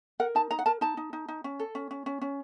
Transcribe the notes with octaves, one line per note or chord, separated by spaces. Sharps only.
A#4 F#5
D#4 A5
D#4 A#5
F#5
A#4 A5
D#4 A5
D#4
D#4
D#4
C#4
A4
C#4
C#4
C#4
C#4